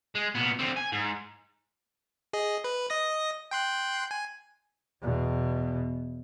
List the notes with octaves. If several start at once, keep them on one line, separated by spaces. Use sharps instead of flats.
G#3
A#2 B3
D3 C4
G#5
G#2
G#4 D#5
B4
D#5 D#6 A#6
G5 C6 F#6
G#5
E2 B2